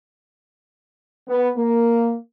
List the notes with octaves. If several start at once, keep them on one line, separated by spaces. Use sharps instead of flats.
B3
A#3